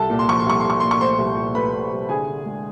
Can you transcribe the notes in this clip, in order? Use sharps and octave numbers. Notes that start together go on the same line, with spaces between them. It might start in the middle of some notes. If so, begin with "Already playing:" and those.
Already playing: C2 A4 A5
A#2
C6
F3 C#6
C6
C2 C#6
C2 C6
C#6
A#2 C6
C#6
A3 C5 C6
C2
A#2
A3 B4 B5
A#2
C2
D3 G#4 G#5
D3
G#3